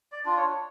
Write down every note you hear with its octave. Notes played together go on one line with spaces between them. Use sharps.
D5
D4 F4
C#5